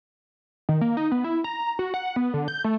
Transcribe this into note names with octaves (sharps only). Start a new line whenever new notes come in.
D#3
A#3
D#4
B3
E4
A#5
F#4
F#5
B3
D3
G6
A3